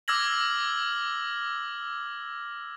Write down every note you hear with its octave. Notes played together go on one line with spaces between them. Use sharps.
D6 E6 F6 G#6 A#6 F#7